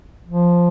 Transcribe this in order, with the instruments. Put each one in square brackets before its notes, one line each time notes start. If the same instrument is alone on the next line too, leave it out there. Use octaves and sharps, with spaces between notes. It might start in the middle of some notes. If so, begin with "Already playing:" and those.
[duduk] F3